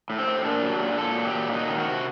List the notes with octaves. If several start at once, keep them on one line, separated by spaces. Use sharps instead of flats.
A2
C4
A2
A#2 D4
F#3
A#2
A#2 A4
F#3
G4
A#2
F#3 D#4
D#3
F#4
C3